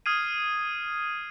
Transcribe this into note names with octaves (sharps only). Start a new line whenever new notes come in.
D#6 F6 G#6 C7 D#7